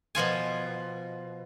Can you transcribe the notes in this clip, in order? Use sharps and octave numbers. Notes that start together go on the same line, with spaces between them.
B2 F3 F4 G#5